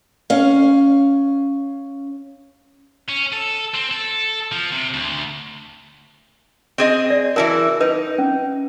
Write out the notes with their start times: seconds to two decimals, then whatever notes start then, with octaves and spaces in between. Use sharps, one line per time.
0.30 C#4 F5
3.09 C#4
3.33 A4
3.75 C4
3.91 A4
4.52 F3
4.72 C3
4.94 D2
6.78 C4 G#4 D#5
7.10 D5
7.36 E3 E4 F#4 A#4 A5
7.81 D#4 B4
8.18 C#4